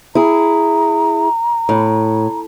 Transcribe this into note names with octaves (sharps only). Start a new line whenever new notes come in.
E4 G#4 A#5
A2